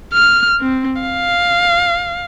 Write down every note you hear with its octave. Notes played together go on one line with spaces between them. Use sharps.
F6
C4
F5